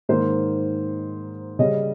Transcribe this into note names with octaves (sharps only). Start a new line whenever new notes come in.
G#2 D#3 A#3 C5
C#3 G3 C#4 D#5